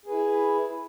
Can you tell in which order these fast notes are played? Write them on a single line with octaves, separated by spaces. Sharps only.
G#4 B4 E4